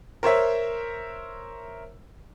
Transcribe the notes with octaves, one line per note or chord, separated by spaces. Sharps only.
A#4 C5 C#5 E5